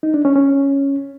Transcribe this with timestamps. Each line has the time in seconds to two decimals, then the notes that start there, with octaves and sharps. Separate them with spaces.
0.03 D#4
0.14 D4
0.25 C#4
0.36 C#4